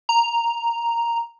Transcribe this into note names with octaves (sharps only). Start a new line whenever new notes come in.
A#5